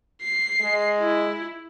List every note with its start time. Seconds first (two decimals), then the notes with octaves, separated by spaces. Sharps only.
0.22 C7
0.60 G#3
0.99 E4